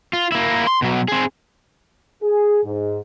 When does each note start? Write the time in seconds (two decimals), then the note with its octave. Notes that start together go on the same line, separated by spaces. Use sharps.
0.13 F4
0.32 A#3 E4
0.67 C6
0.82 B2 F#3
1.08 C4 G#4
2.22 G#4
2.64 G#2